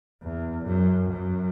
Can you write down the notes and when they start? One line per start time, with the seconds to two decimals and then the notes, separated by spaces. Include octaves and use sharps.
0.23 E2
0.66 F#2
1.09 F#2